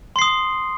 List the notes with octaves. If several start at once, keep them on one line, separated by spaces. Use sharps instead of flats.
C6 D#6 C7